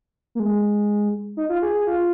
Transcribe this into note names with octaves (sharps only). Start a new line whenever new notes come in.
A#3
G#3
D#4
F4
G#4
G#4
F4